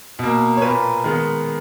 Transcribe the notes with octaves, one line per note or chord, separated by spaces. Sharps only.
B2 A#3
C#5
A#2 A#3 B4
D#3 G#3 B3